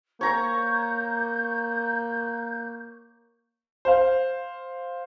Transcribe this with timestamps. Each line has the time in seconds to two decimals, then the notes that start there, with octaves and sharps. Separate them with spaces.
0.21 A#3 C#5 A#5 C#6 G6
3.85 C5 F5